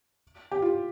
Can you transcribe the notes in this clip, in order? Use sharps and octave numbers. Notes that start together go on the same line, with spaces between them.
G4
F4